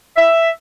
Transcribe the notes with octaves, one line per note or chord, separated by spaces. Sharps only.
E5